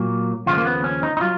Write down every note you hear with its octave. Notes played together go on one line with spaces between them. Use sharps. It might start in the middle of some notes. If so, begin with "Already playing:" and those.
Already playing: A#2 F#3 A#3
D#2 C#3 F3 G#3 F4
A#3
B3
C#4
D#4
D#4
F#3 F4